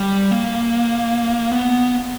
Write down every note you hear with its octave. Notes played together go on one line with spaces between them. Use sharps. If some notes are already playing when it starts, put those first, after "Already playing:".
Already playing: G3
A#3
B3